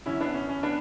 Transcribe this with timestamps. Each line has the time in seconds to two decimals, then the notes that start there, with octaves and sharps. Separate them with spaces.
0.06 F#2 D3 C#4 E4
0.21 B3 D4
0.34 C#4
0.49 C#4
0.63 B3 D4